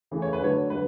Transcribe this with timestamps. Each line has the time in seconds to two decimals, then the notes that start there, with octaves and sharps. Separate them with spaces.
0.11 C#3 E3 A3
0.22 C#5
0.33 B4
0.41 D3 F#3 A3 C#5
0.70 D3 F#3 B4